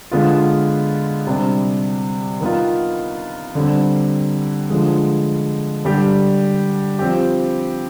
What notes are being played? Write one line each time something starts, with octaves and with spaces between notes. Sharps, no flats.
D3 G#3 B3 F4
C3 G3 D4
D#3 B3 F4
D3 G3 C4
D3 F3 G#3
D3 G3 D4 G4
F3 C4 G4